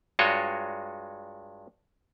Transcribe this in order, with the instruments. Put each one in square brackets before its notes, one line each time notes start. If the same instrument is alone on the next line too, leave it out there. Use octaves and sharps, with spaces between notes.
[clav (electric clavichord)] G2 G#3 F4 F#4 C#5 D#5